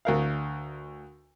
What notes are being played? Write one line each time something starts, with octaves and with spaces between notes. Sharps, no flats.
D2 A#4 F5